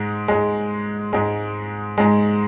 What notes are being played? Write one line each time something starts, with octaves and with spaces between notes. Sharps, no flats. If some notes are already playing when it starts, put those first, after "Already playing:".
Already playing: G#2 G#3
G#2 G#3
G#2 G#3
G#2 G#3